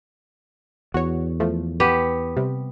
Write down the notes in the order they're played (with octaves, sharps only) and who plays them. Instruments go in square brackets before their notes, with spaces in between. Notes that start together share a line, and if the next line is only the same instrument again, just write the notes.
[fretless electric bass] E2 [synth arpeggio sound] F#4 C#5
[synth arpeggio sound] F3 A3
[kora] B3 G4
[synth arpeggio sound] C3 G3